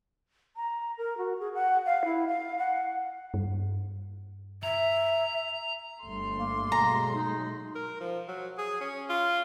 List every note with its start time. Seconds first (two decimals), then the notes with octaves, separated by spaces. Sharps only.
0.57 A#5
0.98 A#4
1.18 F#4
1.40 G#4
1.54 F#5
1.86 F5
2.05 E4
2.27 F5
2.58 F#5
3.34 G2
4.63 E5 A#5
6.03 G1 G2 A3 C6
6.36 A#3
6.72 B2 F#3 G#3 A#5
7.14 D#4
7.75 A#4
8.01 F3
8.28 F#3
8.58 G#4
8.81 C#4
9.09 F4